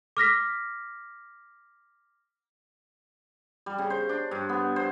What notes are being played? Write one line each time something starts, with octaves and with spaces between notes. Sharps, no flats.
D6 F6 A#6 B6
G3
C#3
C5
D4
G2
B3
C5